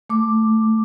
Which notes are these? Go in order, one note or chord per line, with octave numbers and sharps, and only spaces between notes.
A3 D6